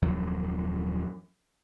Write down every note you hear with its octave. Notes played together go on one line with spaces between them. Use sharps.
D#1 F#2 F3 F#3